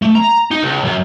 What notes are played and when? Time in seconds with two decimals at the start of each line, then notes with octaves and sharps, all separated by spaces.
0.02 A3
0.15 A#5
0.51 D#4
0.63 C#2
0.84 F#2